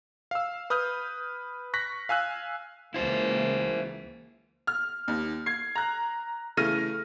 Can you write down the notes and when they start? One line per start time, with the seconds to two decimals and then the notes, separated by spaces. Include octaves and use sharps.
0.31 F5 E6
0.70 B4 D#6 F6 G6
1.74 C#6 F#6 A#6 B6
2.09 F5 G#5 E6 F#6
2.94 C#2 E3 A#3 E4 C5
4.67 F6
5.08 D#2
5.46 G#6 C7
5.75 A#5 F#6
6.57 C#3 E3 A3 F6 A#6 D#7